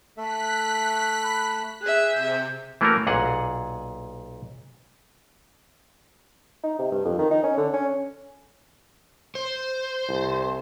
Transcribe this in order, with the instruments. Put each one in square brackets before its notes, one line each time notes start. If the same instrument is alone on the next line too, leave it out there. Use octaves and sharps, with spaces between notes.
[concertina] A3 A4 E5 [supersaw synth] F#6 B6
[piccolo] B5
[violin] G#4 E5 [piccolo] F#6
[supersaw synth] C3 [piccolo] G6
[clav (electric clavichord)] E3 A3 A#3 C#4 F#4 A#4
B1 A#2 G#4 F#5
[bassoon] D#4
C3
G2
F2
D#3
D#4
C#4
D3
C#4
[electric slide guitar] C5
[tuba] C2